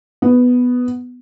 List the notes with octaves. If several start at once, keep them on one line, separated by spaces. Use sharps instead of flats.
B3